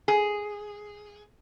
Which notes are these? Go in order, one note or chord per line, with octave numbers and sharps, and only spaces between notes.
G#4